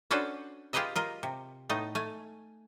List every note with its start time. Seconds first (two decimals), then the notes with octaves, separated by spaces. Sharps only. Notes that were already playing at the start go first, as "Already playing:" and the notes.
0.11 C#4 D4 F#4 A4 B4 C5
0.73 F4 G4 G#4 B4 D#5 E5
0.96 F4 A#4 D#5
1.23 C3
1.69 A2 A3 B3 D#4 D#5
1.95 A3 G#5